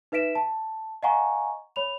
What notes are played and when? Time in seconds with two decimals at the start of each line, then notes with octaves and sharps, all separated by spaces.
0.12 D#4 B4 E5 B6 D7 E7
0.35 A5
1.03 D#5 F5 F#5 G#5 A#5 C#6
1.76 C#5 B5 F7